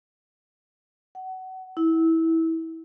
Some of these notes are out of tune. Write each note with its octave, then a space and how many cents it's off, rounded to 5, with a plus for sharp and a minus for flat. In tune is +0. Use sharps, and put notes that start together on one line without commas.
F#5 +25
E4 -20